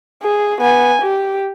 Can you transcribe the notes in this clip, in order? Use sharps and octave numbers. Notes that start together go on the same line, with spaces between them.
G#4
B3 G#5
G4